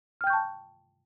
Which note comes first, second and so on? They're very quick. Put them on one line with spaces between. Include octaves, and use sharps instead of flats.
F6 G5 G6 C#6 A5